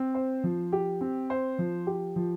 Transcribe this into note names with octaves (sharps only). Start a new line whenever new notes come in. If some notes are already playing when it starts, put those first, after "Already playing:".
Already playing: C4
C5
F3
G4
C4
C5
F3
G4
F3